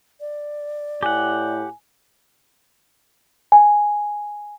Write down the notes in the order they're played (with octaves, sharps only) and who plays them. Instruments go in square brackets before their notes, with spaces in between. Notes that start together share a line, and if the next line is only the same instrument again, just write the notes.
[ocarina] D5
[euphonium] A2 [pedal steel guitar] G4 F#5 [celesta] G#5
[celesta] G#5